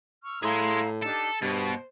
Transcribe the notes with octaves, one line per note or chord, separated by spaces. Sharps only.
C#6 E6 F6
A2 E4 G#4 F5 A#5 C6
D4 D#4 G4 A4
G2 B2 C5